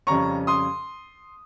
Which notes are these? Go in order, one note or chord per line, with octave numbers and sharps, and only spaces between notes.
F2 C#3 G3 C#4 A#5 C#6
C6 D#6